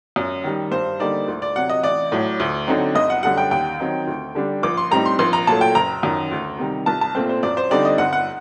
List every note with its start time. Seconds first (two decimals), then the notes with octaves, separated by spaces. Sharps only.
0.16 F#2
0.44 D#3 G3
0.72 G2 C5
0.99 D3 G3 A#3 D#4 D5
1.28 D2
1.42 D5
1.56 C3 F#3 F#5
1.69 D#5
1.83 A1 D5
2.12 A2 F#3
2.40 D2
2.67 D3 F#3 C4 D#4
2.95 G1 D#5
3.10 F#5
3.23 F#2 D3 G3 F#5
3.38 G5
3.51 D#2 G5
3.80 D#3 F#3 C4 D#4
4.07 D2
4.35 D3 G3 D4
4.63 A#1 D6
4.77 C6
4.91 A2 G3 C4 D#4 A#5
5.05 C6
5.19 A#1 C6
5.33 A#5
5.47 A#2 F#3 A3 A5
5.61 G5
5.75 F#1 A#5
6.03 F#2 D#3
6.31 D2
6.59 C3 D#3 G3
6.86 C2 A5
7.01 A5
7.15 A#2 A3 C4 C5
7.29 C5
7.43 F#2 D5
7.57 C5
7.71 D3 G3 C4 D#4 D5
7.85 D#5
7.98 G1 F#5
8.13 F#5